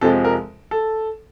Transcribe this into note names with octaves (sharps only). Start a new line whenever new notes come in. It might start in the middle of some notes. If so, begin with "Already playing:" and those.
F2 C3 F3 G#3 A4
A#4
A4